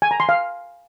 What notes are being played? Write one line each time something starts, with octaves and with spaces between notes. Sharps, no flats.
G#5
A#5
C6
F5